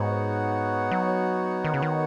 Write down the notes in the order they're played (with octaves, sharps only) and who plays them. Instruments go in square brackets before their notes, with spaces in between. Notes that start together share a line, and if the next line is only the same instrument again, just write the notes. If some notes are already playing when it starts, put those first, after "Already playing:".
Already playing: [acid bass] G#2 [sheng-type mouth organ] B3 D#4 F#4 C#5 F#5
[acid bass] F#3
D#3
C#3
D#3